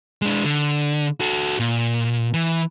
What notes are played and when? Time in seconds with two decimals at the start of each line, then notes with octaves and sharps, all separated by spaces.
0.22 G#3 D4
0.45 D3
1.20 F#4 A4
1.60 A#2
2.34 E3